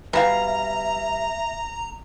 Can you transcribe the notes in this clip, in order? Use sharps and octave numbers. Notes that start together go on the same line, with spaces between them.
B2 E3 G3 E5 F5 A#5